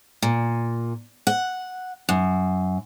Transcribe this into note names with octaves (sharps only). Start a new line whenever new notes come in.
A#2
F#5
F#2